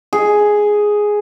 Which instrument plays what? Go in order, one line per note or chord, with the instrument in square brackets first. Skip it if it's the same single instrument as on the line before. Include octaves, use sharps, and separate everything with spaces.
[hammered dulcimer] G#4